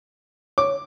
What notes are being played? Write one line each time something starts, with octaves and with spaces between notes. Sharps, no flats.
C#5 D6